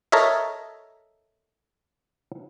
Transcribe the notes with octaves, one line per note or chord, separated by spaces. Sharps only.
A4 A#4 C#5 D#5 E5